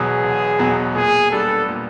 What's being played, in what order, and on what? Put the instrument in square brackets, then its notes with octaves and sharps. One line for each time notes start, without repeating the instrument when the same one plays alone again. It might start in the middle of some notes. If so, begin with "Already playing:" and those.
Already playing: [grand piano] E1 E2 B2 F#3 B3 [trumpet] G#4
[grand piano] E1
E2 B2 F#3 B3
[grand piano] A#2 [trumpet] G#4
[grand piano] G3 B3 D4 [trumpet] A4
[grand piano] A#2